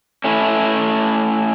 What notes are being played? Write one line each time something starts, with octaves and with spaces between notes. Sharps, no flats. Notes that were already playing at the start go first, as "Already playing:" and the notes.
A3 C#4 E4